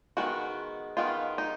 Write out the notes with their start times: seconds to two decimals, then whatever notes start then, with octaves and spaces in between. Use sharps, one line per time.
0.17 D#3 G#3 B3 F#4
0.97 D#3 G#3 B3 F4
1.38 D#4